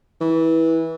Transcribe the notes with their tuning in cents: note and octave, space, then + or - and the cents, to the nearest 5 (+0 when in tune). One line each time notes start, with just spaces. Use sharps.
E3 -20